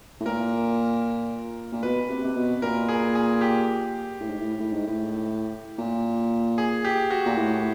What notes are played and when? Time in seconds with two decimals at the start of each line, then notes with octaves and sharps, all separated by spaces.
0.20 A2
0.25 A#2 A#4
1.72 A#2
1.83 B2 B4
2.10 C3
2.24 C3
2.36 B2
2.62 A#2 A#4
2.89 G#4
3.15 G#4
3.41 G4
4.21 A2
4.29 G#2
4.39 A2
4.59 A2
4.73 G#2
4.87 A2
5.78 A#2
6.58 G#4
6.85 G4
7.10 F#4
7.26 A#2
7.37 A2